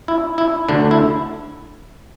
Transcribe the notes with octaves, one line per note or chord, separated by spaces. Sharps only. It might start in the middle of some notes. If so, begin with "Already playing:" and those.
E4
E4
D2 D3 D4
E4